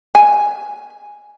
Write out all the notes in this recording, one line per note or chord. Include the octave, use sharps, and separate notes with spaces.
G#5